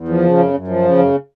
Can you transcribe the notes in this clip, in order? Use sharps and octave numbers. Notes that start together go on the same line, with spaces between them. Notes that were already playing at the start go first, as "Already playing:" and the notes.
Already playing: E2
F3
C#3
F#2
F#2
F3
C#3
F#2